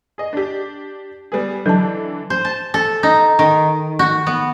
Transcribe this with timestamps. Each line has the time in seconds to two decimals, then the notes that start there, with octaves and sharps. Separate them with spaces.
0.18 G#4 D#5
0.33 D4 G4
1.32 G3 B3 G#4
1.66 D3 E3 F#3 D4 A5
2.30 C5
2.45 A5
2.74 A4
3.03 D#4
3.39 D#3
3.99 F#4
4.27 B3